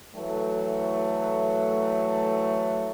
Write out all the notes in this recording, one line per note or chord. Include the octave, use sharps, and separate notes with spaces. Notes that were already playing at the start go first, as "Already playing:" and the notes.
E3 F#3 A3